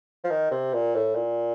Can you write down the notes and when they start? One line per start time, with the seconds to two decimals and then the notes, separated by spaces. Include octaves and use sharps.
0.24 F3
0.30 D#3
0.51 C3
0.74 A#2
0.95 A2
1.15 A#2